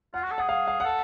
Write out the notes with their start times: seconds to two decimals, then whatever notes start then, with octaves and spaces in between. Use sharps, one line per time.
0.14 F4 F#5
0.23 F#4
0.31 A4
0.38 G#4 F#5
0.49 G#4 F5
0.67 F5
0.80 A4 F#5